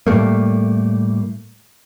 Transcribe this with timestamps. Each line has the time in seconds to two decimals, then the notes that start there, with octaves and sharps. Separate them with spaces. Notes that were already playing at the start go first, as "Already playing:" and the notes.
0.07 A2 G3 A3 A#3